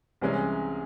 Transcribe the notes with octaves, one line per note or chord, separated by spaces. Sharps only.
C2 C3 E3 G#3 C#4